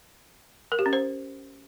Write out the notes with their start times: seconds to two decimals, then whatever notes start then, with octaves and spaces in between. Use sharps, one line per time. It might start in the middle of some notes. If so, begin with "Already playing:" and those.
0.72 A#4
0.79 G4
0.86 C#4
0.93 C5